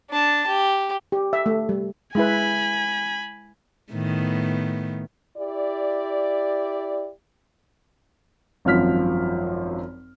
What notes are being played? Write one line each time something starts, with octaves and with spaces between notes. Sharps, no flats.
D4 A5
G4
G4
E5
A3
G3
G#3 E4 B4 G#5 B5
A2 D#3 B3
E4 G4 D5
G#1 F#2 F3 F6 B6